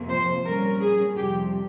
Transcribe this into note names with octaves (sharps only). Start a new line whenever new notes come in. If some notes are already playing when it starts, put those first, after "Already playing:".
Already playing: F2 C3 F3 A#3
C5
A#2 G3 C#4 A#4
G#4
F2 C3 G3 G4